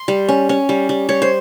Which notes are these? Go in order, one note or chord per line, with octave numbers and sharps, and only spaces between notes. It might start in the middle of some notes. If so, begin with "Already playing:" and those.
Already playing: C6
G3
C#4
C#4
G3
G3
G3 C#5
C5